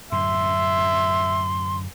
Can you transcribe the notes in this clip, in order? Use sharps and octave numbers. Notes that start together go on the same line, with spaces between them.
F#2 A2 D3 E5 C6